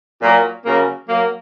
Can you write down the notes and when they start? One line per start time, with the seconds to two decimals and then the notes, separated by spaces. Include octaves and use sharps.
0.22 A#2 F#3 A#3
0.65 C#3 F#3 A#3
1.08 F#3 A#3